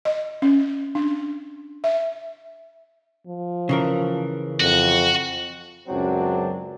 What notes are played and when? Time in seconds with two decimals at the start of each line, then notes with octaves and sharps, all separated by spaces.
0.05 D#5
0.42 C#4
0.95 D4
1.84 E5
3.27 F3
3.69 C#3 E3 A#4
4.60 F2 F#4
5.88 C#2 F#2 F#3 C4 D4